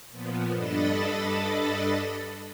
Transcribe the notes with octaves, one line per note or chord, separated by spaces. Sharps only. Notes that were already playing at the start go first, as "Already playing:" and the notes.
A#2 F3 B3
G2 D4 A4 D#5 B5 A6